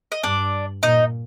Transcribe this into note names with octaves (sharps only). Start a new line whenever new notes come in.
D#5
G2 D4 D5
A#2 D#4 D#5